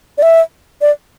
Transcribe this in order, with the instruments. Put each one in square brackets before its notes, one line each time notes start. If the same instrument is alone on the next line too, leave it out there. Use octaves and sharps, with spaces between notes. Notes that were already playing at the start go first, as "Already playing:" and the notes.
[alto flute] D5
E5
D5